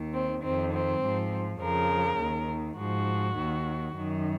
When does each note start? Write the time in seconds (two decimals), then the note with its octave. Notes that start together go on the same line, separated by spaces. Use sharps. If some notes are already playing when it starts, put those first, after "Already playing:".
Already playing: D#2 D#3
0.13 C4
0.42 F2 D#3 C4
0.73 C4
1.02 G#2 F3
1.60 F2 C#3 F3 A#4
2.20 D#2 D#3
2.78 G#2 F3 F#4
3.37 D#2 D#3
3.95 F#2 D#3